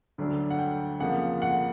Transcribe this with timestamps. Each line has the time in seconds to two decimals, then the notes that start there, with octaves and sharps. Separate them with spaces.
0.18 D2 D3 F#3 A3 D4
0.50 F#5
0.59 G5
1.00 F2 C#3 F3 A#3 F#5
1.42 F#5